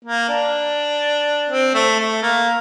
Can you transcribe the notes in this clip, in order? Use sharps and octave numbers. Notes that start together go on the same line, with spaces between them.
A#3
D4
C4
A3
A3
A#3